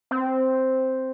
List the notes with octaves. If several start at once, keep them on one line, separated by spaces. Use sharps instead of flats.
C4